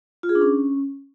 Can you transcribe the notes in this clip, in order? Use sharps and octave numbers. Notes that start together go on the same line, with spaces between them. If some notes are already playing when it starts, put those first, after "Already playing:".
F4
G#4
D4
C#4